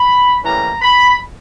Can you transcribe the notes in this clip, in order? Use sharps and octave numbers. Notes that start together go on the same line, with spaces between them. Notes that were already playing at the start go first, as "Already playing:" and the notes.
Already playing: B5
A2 E3 G3 A#3 C#4 A#5
B5